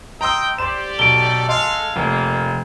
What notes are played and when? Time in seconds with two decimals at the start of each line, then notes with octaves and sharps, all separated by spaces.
0.21 D#5 G5 A#5 C6 E6
0.58 G4 C5 D5 E7
0.99 B1 A4 D7 G7
1.49 G#3 D#5 F5 C6
1.96 F1 A#3